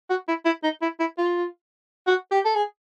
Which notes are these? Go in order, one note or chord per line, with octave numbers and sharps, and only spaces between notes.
F#4
E4
E4
D#4
E4
E4
F4
F#4
G4
A4
G#4